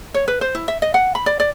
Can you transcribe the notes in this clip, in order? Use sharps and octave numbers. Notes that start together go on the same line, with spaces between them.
C#5
B4
C5
E4
E5
D#5
F#5
B5
D5
D5